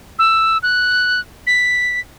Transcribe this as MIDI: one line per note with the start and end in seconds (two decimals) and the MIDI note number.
0.19 0.58 88
0.63 1.20 90
1.47 2.00 95